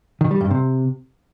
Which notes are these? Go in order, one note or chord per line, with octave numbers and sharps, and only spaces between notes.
D#3
G3
G2
C3